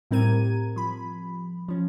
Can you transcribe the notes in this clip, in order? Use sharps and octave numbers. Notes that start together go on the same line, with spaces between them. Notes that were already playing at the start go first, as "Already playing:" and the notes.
A2 G3 C4 A#4 G#6 D#7
F3 B5
F3 C#4